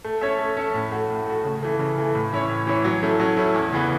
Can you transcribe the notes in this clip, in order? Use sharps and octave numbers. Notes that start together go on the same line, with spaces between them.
A3
C#4 A4 C#5 E5
A3
C#4 A4 C#5 E5
A2
A3 F#4
A2
A3 F#4
C#3
E3 A3
C#3
E3 A3
A2
E3 C#4 E4 C#5
A2
E3 C#4 E4 C#5
F#3
A3 C#4 E4
F#3
A3 C#4 E4
E2
C#3 E3 B3